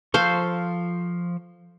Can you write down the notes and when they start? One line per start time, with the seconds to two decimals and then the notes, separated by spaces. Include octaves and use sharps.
0.14 F3 A4 C5 F5 C#6